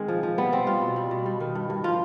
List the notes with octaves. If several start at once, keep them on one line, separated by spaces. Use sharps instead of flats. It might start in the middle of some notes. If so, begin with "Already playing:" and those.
Already playing: D#3 G#3 C4
F3
F3
G3 B3
G3 C4
G3 F4
B2
G3
B2
G3
D#3
G2
G2
F3 F4